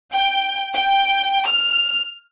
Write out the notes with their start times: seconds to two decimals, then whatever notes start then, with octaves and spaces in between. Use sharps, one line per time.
0.14 G5
0.76 G5
1.48 F6